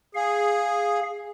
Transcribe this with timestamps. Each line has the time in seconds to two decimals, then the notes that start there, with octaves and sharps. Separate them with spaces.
0.15 G#4 F5